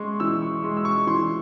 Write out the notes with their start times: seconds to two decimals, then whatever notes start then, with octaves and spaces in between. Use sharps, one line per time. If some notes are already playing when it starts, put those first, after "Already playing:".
Already playing: G#3 C6 C#6
0.20 E3 E6
0.42 C#6
0.64 G#3 C6
0.77 E6
0.85 C#6
1.07 E3 C6